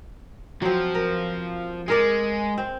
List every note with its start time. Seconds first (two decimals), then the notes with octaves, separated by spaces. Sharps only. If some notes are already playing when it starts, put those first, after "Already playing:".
0.62 F3 F#3 C4
0.95 A#4
1.88 G#3 G#4 A#4 D5
2.58 C4